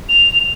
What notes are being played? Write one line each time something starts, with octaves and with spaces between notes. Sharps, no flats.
F7